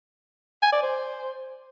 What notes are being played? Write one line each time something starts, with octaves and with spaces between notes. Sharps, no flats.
G#5
D5
C5